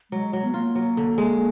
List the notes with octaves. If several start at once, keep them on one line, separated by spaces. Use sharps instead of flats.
F#3 G#3
F#3
B3
A#3 F4
F#3
D3
G#3